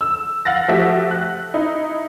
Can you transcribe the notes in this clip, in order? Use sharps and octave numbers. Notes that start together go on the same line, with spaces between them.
E6
F5 F#5 A6 A#6
F3 A3 F#4 G4 E5 B6
F#6
D#4 E4